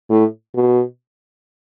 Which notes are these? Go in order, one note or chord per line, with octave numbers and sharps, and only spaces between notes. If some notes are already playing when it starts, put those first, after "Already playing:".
A2
B2